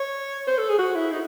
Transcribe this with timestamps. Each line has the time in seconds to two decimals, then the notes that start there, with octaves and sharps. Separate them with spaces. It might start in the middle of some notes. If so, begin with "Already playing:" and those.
Already playing: C#5
0.47 C5
0.58 A4
0.69 G#4
0.79 F#4
0.95 E4
1.12 D#4